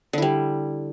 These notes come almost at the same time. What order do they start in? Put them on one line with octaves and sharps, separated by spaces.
D3 E4 G3